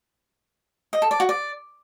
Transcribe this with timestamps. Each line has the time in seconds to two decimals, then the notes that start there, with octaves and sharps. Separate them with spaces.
0.93 D#5
1.02 A4
1.11 D5
1.20 F#4
1.29 D5